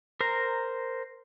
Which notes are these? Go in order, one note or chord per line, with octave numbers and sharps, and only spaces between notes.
A#4 C5 A#5